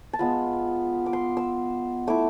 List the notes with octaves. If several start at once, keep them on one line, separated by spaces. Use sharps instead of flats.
A5
G#3 B3 F4 B5
D6
C6
E6
A3 E4 D6